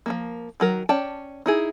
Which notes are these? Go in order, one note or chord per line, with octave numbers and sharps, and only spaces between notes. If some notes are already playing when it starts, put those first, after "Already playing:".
F3 G#3 A#3
D#3 F#3 A#4
C#4 D5 G5 A5
D#4 E4 G#4